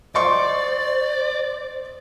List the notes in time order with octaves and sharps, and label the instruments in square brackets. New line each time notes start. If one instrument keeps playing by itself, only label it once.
[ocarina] C5 [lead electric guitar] D5 [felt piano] D#5 C6 C#6